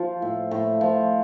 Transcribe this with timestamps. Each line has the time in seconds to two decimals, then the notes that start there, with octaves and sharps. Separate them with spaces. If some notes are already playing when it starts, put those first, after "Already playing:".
Already playing: F3 F4 F5
0.22 A2
0.51 A2
0.81 F3